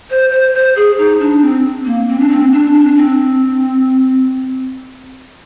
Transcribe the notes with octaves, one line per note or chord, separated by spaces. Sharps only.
C5
C5
C5
G#4
D#4
D4
C4
A#3
C4
D4
C4
D4
D4
C4